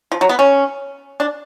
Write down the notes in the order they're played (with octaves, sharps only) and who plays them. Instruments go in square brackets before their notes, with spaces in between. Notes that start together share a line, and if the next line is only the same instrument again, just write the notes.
[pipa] F3
F#3
B3
C#4
D4